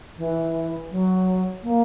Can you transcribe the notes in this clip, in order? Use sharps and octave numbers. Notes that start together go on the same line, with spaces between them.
E3
F#3
A#3